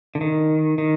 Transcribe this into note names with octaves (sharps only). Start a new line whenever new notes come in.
D3
D#3
D#3